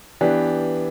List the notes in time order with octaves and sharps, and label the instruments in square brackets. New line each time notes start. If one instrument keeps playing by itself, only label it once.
[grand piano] E3 B3 D4 G4